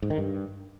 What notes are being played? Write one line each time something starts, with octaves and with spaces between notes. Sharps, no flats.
G#2
D#3
G2